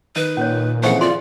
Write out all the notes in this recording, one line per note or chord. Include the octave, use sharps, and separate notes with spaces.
D#3 B4
A#2 C#4 C#5
F2 C#3 E3 D#4 C5 F#5 C#6
F4 G#4 D5 C6